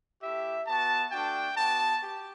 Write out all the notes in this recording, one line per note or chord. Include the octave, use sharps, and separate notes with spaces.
A3 E4 G4 E5
B3 F#4 A5
A3 D4 F#4 G5
B3 F#4 A5
G4